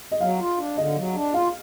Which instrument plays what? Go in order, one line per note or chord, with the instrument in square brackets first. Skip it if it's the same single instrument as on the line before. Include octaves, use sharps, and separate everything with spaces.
[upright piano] D#5
[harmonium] F#3 [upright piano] F5
[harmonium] F4
D4
[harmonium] D3 [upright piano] D#5
[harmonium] F#3
D4
[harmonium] F4 [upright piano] F5